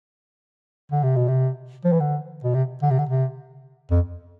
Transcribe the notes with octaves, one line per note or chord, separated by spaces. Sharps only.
D3
C3
B2
C3
F3
E3
D3
B2
C3
D3
C3
D3
C3
F2